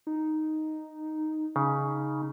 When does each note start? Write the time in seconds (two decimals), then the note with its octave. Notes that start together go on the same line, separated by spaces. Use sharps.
0.07 D#4
1.56 C#3 D#4